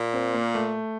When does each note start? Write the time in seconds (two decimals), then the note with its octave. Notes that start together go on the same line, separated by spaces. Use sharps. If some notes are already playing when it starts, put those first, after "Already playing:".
Already playing: A#2
0.13 C4
0.34 A#3
0.55 A3